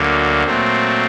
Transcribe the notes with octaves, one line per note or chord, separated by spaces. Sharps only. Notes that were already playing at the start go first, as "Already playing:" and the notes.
Already playing: D2 D3 F#3 A#3
A#2 F#3 A3 C4